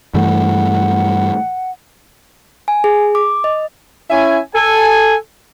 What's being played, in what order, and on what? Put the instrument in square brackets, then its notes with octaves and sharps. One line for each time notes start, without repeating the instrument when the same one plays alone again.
[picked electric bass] G2 E3 A3 [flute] F#5
[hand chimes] G#5
G#4
D6
D#5
[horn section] C#4 E4 E5 G#5
A4 G#5